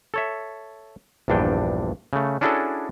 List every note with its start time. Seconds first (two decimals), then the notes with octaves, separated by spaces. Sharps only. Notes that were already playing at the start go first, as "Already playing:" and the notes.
0.14 A4 C#5 E5
1.28 A#1 E2 G2 D4 G5
2.13 C#3 A3
2.41 C#4 D4 E4 F#4 G#4 A4